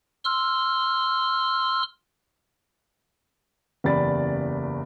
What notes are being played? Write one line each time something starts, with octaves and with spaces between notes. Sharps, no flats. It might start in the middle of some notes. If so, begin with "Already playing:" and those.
C6 E6 F6
F#1 E2 G4 D5 B5 A6